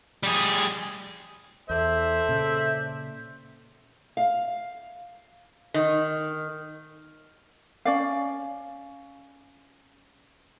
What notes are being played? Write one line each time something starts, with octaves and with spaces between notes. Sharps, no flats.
G3 G#4
E2 A4 C5 D5 E5
A#2 C#3
F5
D#3
C#4 D5 F5